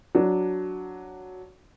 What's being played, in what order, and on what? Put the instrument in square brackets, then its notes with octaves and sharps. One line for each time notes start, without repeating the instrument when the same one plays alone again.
[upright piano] F#3 D4